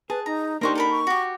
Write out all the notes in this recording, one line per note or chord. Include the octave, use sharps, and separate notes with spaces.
G#4 B4 A5
D#4 A#5
A#3 D4 D#4 G4 A#4 C5 C#6
A4 A#4 B5
C#6
F#4 G4